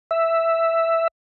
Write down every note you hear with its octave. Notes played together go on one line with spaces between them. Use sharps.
E5